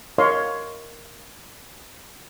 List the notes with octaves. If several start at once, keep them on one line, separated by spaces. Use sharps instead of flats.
A#4 C#5 D#5 F5 C6